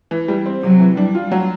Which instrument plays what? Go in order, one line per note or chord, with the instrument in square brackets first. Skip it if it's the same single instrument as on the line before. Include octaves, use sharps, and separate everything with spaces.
[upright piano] E3
G3
C4
[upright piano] C3 [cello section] F#3
[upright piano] E3
[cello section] G3 [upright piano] D4
[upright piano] F4
F#3